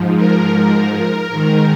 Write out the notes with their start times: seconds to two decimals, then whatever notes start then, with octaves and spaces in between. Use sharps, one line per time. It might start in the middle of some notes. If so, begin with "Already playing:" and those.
Already playing: G#2 F3
0.17 A#4
0.92 A#4
1.29 G#2 D#3